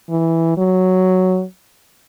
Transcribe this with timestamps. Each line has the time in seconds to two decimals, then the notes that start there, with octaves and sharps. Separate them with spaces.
0.10 E3
0.58 F#3